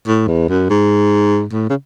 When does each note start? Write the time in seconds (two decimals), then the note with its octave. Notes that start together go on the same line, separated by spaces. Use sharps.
0.07 A2
0.27 E2
0.49 F#2
0.70 G#2
1.53 A2
1.70 C#3